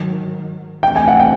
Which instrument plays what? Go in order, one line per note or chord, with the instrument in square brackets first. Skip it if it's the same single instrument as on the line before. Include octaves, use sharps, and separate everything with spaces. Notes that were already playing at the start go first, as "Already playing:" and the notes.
Already playing: [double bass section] G#2 D#3 F#3
[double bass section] E2 C3 E3 A3 C4 [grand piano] G5
[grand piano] G#5
F#5
G5